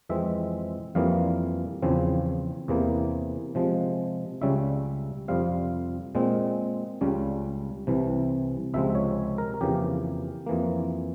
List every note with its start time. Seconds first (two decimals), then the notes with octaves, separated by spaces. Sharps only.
0.09 F2 E3 G#3 C4 E5
0.95 F2 E3 G3 A#3 F5
1.82 E2 C#3 F3 C4
2.68 E2 C3 E3 A#3
3.55 C3 F3 G#3
4.41 C#2 C#3 G3 C#4 E5
5.28 F2 C3 G3 C4 F5
6.15 A#2 G#3 C4
7.01 C#2 C#3 G3 C#4
7.87 C2 C3 E3
8.74 C#2 C3 F3 G#3 C4 E5
8.95 C#5
9.38 A#4
9.61 F2 C#3 E3 A#3 G4
10.46 F2 E3 A#3